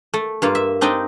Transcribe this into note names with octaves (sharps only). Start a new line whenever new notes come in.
A3
G2 A#3 F4
E5
C4 D4 D#4 D#5 G5